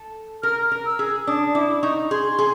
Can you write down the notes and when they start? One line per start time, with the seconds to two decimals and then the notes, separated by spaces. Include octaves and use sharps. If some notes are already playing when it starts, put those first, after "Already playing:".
Already playing: A4
0.43 A#4 F6
0.72 A#4
0.86 E6
0.99 G#4
1.27 D4 D#6
1.55 E4 D6
1.82 D#4 C#6
2.11 G#4 C6
2.39 G#4